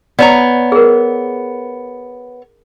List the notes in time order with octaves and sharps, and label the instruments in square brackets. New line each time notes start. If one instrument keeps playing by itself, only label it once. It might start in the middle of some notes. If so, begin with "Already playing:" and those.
[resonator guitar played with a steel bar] B3 C#5 A#5 [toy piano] D5
[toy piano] G#4 A#4